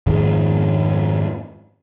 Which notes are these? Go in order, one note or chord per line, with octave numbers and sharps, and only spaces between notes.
F2 G#2 D#3 G#3